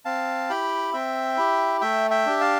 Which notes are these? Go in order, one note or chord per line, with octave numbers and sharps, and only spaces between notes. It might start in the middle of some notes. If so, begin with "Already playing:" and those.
C4 F5 A5
E4 G4 G5 B5
C4 E5 G5
E4 G4
A3 E5 G5
E5 G5
D4 G4
F5 A5